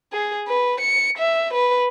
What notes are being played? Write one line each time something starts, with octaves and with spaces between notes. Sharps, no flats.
G#4
B4
C#7
E5
B4